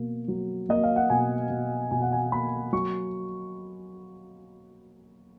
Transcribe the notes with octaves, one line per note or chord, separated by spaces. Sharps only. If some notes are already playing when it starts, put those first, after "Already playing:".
Already playing: B2 A#3
F#3
A#3 D#5
F5
F#5
B2 G#5
B2
B2 G#5
F#5
G#5
A#3 B5
F#3 C#6